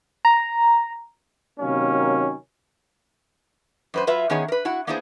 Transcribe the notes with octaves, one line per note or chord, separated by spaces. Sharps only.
A#5
C3 D#3 F#3 A#3 C#4
F#2 B4 C5
F#3 F4 B4 E5
D#3 B3 C#4 G#4 C#5
A#4 B4
E4 F#4 F#5
A#3 B3 D4 E4 G#4 C5